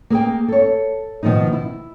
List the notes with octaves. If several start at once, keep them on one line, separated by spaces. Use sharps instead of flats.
A#3 G#4 A#4 G5
A4 C#5
B2 D#3 F3 A#3 D#4
E4